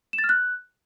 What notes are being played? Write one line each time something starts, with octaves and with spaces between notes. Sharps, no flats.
E7
A6
F6
F#6